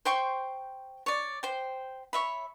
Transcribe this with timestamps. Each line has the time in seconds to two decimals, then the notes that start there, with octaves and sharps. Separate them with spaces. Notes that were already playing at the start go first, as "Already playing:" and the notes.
0.05 C5 G5 C6 C#6
1.06 C#5 D5
1.43 C5 G5
2.13 C#5 E5 B5